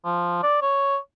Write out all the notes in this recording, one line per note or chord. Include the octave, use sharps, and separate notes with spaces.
F3
D5
C#5